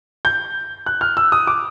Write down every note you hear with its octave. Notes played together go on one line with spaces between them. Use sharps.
G6
F#6
F6
E6
D#6
D6